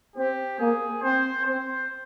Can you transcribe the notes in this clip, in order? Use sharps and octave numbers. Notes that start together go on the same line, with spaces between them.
C4 G4
A#3 G#4
C4 C5
C4 C5